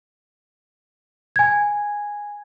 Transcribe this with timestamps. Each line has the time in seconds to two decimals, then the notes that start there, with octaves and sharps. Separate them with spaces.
1.36 G#5 G#6